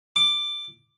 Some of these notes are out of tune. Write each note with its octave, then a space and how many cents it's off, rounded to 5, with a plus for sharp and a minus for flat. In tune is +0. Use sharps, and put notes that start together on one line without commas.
D6 +5